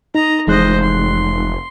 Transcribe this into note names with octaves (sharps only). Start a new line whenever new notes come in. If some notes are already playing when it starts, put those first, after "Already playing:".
D#4 D#5 A#5
F1 E3 G#3 C5 D#5 F#6
C6